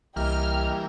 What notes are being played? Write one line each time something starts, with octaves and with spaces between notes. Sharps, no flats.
C2 E3 G3 A#3 D#5 G5 F6